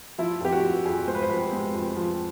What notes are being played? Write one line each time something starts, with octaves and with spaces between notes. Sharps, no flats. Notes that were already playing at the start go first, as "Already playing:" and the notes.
F3 E4
F2 G4
F#4
F2
F2 G#4
G#3 C5
B4
C5
F2 B4
G#3
F2
F3